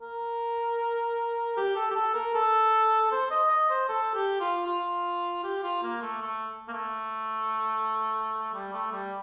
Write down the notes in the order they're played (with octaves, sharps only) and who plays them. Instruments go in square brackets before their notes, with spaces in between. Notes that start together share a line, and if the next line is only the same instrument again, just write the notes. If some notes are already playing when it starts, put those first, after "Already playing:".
[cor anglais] A#4
G4
A4
G4
A4
A#4
A4
C5
D#5
D#5
C5
A4
G4
F4
F4
G4
F4
A#3
A3
A3
A#3
A3
G3
A3
G3